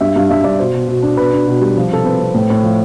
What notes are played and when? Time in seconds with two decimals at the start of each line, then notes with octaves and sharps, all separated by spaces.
0.01 G2 E5
0.16 G2 F5
0.31 G2 E5
0.44 G2 D5
0.59 B2 C5
0.74 B2
0.88 B2
1.02 D4
1.17 B2 B4
1.32 D4
1.47 B2
1.61 G3
1.77 F3
1.91 C3 A4
2.05 C4 B4
2.20 C4
2.34 A2
2.50 A2
2.63 F3